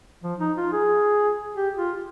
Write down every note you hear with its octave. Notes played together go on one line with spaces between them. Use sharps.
F3
D#4
F4
G#4
G4
F4